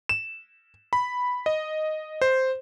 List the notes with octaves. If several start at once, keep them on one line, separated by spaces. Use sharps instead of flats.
E7
B5
D#5
C5